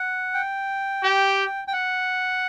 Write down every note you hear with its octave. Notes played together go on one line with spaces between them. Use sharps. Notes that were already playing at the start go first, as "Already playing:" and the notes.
Already playing: F#5
G5
G4
G5
F#5